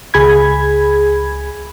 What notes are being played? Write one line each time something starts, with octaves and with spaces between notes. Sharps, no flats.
C#2 G#4 B5 G#6